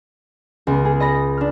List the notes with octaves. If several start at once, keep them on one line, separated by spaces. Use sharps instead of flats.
C#2 B3
G#4
D#5 B5 A#6
D4 F6